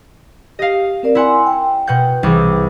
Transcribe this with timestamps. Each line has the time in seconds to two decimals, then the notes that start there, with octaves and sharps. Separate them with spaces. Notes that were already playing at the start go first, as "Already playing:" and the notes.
0.59 G4 D#5 F5
1.03 C4 A#4 D5
1.15 E4 F#5 G#5 C6 E6
1.46 G5
1.87 B2 F#5 G6
2.23 C2 E3 G#4 D6 E6